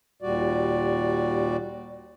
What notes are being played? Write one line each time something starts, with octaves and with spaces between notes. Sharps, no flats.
D#2 A#2 G3 F#4 D5